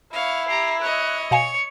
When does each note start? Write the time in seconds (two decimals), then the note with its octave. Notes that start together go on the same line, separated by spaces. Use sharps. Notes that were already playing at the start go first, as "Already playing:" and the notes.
0.13 E4 C#5 F5
0.48 G4 A#5 C7
0.81 C#5 D#5 F#6
1.31 B2 C#5 F5 G#5 C#7